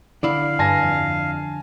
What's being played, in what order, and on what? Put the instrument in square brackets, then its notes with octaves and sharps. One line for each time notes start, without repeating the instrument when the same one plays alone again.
[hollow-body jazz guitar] D3 E4 [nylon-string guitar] D5 [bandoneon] F5
[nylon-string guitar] G2 [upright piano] G#5 A5 A#6
[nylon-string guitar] F2